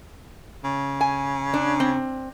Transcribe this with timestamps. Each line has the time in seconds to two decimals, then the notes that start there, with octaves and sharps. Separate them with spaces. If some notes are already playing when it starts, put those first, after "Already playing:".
0.64 C#3
1.01 G#5
1.54 D4
1.80 C4